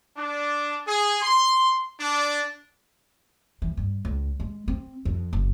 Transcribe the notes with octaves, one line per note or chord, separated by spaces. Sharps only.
D4
G#4
C6
D4
E3
G2
C#2
G#3
C4
F2
F#1